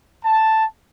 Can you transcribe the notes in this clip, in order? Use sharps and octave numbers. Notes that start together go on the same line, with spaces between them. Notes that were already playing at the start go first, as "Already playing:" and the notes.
A5